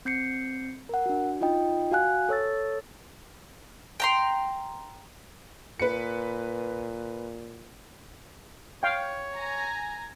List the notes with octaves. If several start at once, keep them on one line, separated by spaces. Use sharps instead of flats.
C4 G6 C7 C#7
A#4 F#5
D4 F#4
D#4 F4 D#5 G5
F#4 F5 G#5 F#6
A4 C#5 E6 A6
G5 A#5 C6
A#2 B4 C#7
C#5 F5 G5
G#5 A#5